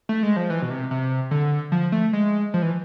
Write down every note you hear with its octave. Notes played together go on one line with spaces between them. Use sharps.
A3
G#3
F3
E3
B2
C3
C3
D3
F3
A3
G#3
F3
E3